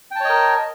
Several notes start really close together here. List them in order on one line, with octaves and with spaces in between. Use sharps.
G5 A5 C#5 D#5 A#4